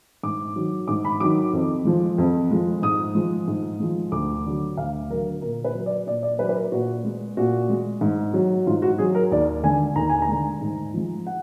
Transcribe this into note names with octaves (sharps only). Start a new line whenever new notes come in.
G#2 D6
D#3 F#3
G#2 D6
B5
D#3 F#3 D6
F2
F3 G#3
F2
F3 G#3
G#2 D#6
F3 G#3
G#2
F3 G#3
D2 D6
D3 F#3
D2 F5
D3 F#3 A#4
A#2 A#4
B4
F#3
D5
A#2 D5
D5
F#3 B4
B4
A#4
A#2 F#4
G#3
A#2 F#4
G#3
G#2
F#3
G#2 F4
F#4
F#3 G#4
A#4
D#2 D5
D3 G#3 G#5
D#2 A#5
G#5
A#5
D3 G#3
G#2
F3 G#3
F#5